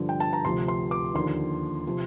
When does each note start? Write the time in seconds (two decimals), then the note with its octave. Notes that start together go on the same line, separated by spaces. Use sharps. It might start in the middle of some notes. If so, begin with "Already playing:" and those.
Already playing: G2 D3 F3
0.09 G5
0.20 A5
0.33 A#5
0.45 D2 C3 F3 C6
0.68 C6
0.91 D6
1.15 D#2 D3 F3 C6
1.87 C3 F3